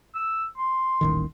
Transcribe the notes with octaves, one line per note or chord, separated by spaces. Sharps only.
E6
C6
D#1 A1 D#3